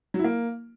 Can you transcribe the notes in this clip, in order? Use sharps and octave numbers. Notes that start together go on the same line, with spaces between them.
F#3
E4
A#3